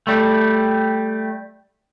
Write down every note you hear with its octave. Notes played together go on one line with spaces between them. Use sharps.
G3 A3